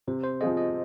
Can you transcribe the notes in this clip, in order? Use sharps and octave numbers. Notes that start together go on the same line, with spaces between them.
C3 C5
C5
F3 C4 F4 G#4 D#5
D#5